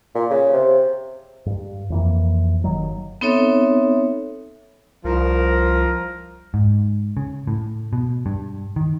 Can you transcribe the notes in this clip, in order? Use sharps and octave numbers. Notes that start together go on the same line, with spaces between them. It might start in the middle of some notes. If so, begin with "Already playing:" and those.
A#2
C#3
C3
G2
F2 E3 A#3
G1 D#3 F#3
B3 C4 D#4 A4 C#5 E5
C2 F3 A#4
G#2
C#3
A2
B2
G2
D#3